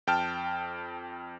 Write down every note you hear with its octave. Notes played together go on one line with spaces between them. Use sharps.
F2 G5 A5 F6